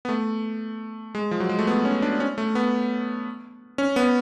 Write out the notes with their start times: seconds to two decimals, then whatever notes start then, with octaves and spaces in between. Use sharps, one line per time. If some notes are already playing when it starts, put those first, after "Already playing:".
0.05 B3
0.09 A3
1.15 G#3
1.31 F3
1.40 F#3
1.49 G#3
1.59 A3
1.67 B3
1.85 C#4
2.02 D4
2.20 C#4
2.38 A3
2.55 B3
3.78 C#4
3.96 B3